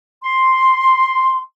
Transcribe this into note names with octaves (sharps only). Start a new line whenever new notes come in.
C6